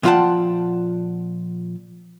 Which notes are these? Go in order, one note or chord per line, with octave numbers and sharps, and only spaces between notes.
A#2 F3 F4 F#5 G5 A5